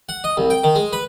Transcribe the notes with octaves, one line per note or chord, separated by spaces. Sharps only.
F#5
D#5
C2
G5
D#3
G#3
B4